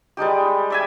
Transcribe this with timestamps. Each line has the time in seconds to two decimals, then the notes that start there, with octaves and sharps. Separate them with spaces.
0.17 G3 G#3 D#4 G4
0.70 D5 E5 G#5